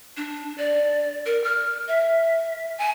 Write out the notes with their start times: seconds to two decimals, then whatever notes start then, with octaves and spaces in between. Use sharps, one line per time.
0.17 D4
0.58 D5
1.26 A#4
1.44 F6
1.88 E5
2.78 G#5